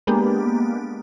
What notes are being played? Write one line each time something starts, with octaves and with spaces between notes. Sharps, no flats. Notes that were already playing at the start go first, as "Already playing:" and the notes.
G#3 A#3 B3 D4 G4